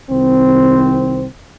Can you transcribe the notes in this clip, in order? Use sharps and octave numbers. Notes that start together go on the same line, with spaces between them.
C2 D#3 C4